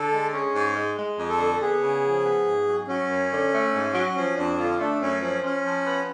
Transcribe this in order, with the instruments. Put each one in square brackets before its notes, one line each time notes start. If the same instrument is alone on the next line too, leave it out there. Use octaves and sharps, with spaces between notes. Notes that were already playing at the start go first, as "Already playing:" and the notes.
Already playing: [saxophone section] D3 [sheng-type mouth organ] A4
[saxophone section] G#3
[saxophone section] C#4 [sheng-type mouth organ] G#4
[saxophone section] G#2
G#3
G#3
F2
[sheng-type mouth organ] A4
[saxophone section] D3
[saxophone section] B3 [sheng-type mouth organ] G#4
[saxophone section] C#3
F3
B3
G#2
F#3
[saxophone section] F#3 [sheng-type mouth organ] C#4
[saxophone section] F#2
D3
A3
G#2
F#3
[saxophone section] F3 [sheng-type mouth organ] C#4
[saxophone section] F2 [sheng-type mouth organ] D4
[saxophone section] D3 [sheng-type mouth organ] F4
[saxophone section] A3 [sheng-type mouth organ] D4
[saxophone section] F#2 [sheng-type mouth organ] C#4
[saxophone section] F3 [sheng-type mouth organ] C#4
[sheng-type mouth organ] C#4 [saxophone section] F4
[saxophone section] F3
B3